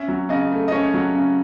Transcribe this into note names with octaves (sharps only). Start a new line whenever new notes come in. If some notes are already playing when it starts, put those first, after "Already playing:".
Already playing: C#4 E5
F#3
C#3 D#5
A3
D#5
C#4 C#5
F#3
C#3